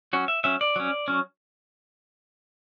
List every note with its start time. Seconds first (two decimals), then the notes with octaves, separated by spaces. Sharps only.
0.13 F#3 C#4 F#4
0.28 E5
0.44 F#3 C#4 E5
0.61 D5
0.76 F#3 C#4
1.08 F#3 C#4